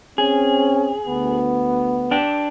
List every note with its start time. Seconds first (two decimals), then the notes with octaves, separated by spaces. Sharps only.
0.18 C4 C#4 G#4
1.07 D2 B3
2.11 D4 G5